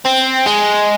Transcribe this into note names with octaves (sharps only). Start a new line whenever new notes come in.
C4
G#3